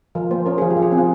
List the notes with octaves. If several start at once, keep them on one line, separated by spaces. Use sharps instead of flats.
F3 A#4
A#3 C5
C#4 A#4
F3 G#4
G4
F3
G#4
C4
F4